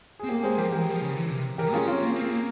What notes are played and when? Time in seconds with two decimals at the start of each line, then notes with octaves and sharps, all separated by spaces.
0.19 G#4
0.24 C4
0.28 A#3 G4 A#4
0.39 A#4
0.43 G#3 G#4 C5
0.58 F3 G4 A#4
0.72 E3 G4 A#4
0.87 F3
1.01 C#3
1.15 E3
1.30 C3
1.58 E3 G4 A#4
1.73 C#4 F4 G#4
1.87 C4 C#4 F4
2.02 A#3
2.16 C4
2.31 A#3